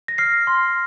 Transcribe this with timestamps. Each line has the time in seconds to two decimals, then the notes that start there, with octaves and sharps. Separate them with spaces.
0.08 A#6
0.18 F6 C7
0.47 C6